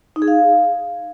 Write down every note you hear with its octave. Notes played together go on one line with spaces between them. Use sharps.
D#4
G#4
F5